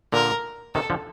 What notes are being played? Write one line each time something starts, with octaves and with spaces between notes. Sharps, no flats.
A#2 D3 A#4
C3 D#3 A4
D3 F3